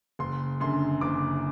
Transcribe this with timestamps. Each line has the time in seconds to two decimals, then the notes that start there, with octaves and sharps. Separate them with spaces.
0.19 F#1 C6
0.60 F#2 D3 C6
1.01 F#1 D6